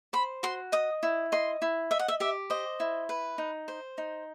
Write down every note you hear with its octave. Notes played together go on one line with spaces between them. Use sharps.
C5 B5
F#4 C6
D#5 D#6
E4
D#5 C6
E4
D#5 E5
F#5
E5
G4 E5
C5 D#5
E4
B4
D#4
C5
D#4